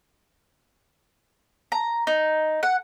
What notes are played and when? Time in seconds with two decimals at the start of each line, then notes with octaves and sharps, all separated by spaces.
1.72 A#5
2.07 D#4
2.63 F#5